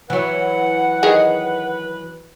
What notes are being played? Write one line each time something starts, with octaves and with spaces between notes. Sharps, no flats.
E3 F#3 B4 F#5
D#3 G#4 D#5